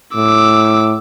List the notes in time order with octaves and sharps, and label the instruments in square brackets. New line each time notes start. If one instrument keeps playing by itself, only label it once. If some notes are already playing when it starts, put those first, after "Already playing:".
[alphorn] A2 [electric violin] D6 E6